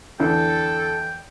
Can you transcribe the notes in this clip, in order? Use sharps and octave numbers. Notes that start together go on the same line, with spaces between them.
E2 D3 A4 G5